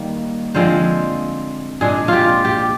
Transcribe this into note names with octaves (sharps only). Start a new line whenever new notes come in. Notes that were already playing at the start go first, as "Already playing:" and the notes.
Already playing: D#3 G3 A#3
D3 F3 G#3 C4 C5
A#2 G#3 D4 G#4
F4 G4
G4